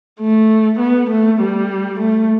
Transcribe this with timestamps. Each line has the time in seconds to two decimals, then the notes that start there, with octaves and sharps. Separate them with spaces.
0.20 A3
0.80 B3
1.10 A3
1.40 G3
2.00 A3